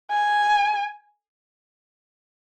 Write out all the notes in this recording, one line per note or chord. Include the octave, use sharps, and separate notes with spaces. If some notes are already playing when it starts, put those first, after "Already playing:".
G#5